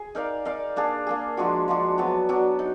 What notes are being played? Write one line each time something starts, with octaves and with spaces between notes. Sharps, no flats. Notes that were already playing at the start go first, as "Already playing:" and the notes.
Already playing: G#4
D#4 A#4 D5 F5
D#4 A#4 D5 F5
A#3 D4 G#4
A#3 D4 G#4
F3 G#3 D4 F#4
F3 G#3 D4 F#4
F#3 B3 D4
F#3 B3 D4
D#4